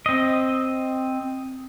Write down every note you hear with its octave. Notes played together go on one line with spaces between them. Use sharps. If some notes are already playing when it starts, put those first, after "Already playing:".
C4 D#5